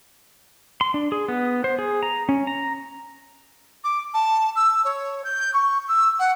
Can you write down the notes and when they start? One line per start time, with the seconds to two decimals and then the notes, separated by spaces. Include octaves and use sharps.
0.81 C6
0.94 D4
1.12 G#4
1.28 B3
1.64 C5
1.79 G#4
2.03 A#5
2.29 C#4
2.47 A#5
3.84 D6
4.14 A5
4.56 E6
4.85 C#5
5.24 G6
5.54 C#6
5.88 E6
6.19 F#5